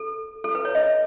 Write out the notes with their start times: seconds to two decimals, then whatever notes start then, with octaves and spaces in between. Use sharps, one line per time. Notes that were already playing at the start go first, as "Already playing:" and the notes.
Already playing: A4
0.44 A4
0.55 B4
0.65 C#5
0.75 D#5